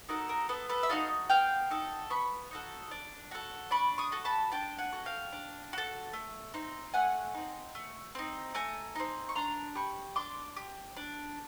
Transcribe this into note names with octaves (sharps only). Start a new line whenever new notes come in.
D#4 F#4 A4 A#4
A#4
B3 A4
A4 B4
E5
D#4 F#4 A4 D#5 F5
B3 F5 G5
D#4 F#4 A4
B3 B5 C#6
D#4 F#4 A4
D4
F#4 A4
D4 B5 C#6
C#6 D#6
F#4 A4
A5 B5
D4 G5 A5
F#5 G#5
F#4 A4
F5 G5
D4
F#4 A4
A3
C4 D#4
A3 F#5 G#5
C4 D#4
A3
C4 D#4
A3 G#5 A#5
C4 D#4
C#6
D4 A#5 C6
G4 B5 C#6
D4 C6 D6
G4
D4